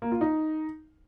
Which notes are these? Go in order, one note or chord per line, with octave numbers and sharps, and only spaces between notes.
A#3
F4
D#4